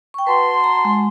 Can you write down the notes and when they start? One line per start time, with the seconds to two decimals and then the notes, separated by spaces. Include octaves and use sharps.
0.14 G5 C#6
0.27 F#4 B4 A5 C6
0.64 A#5
0.85 G#3